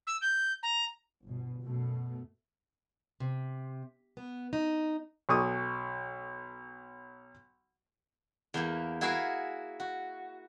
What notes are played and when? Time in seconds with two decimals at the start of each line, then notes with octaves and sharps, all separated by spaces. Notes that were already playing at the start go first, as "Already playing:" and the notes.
0.07 E6
0.22 G6
0.63 A#5
1.24 G1 B2
1.62 F#2 B2 A3
3.20 C3
4.17 B3
4.53 D#4
5.29 B1 A4 C#6 D#6
8.54 E2 E3 A#3
9.01 E4 F#4 G#4 A#4 E5 F5
9.80 F#4